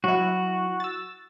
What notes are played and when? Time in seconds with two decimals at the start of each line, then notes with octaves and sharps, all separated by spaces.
0.04 F#3 E4 F#4
0.80 E6 A6